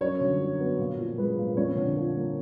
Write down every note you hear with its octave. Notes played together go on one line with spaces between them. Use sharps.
F#2 C#5
D3
F#3
B3
A#2
F3
G#3 B4
A#2
F2 C#5
D3
F3
A#3